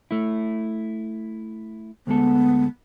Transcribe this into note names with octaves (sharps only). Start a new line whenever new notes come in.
A3 E4
D2 G#3 B3 A4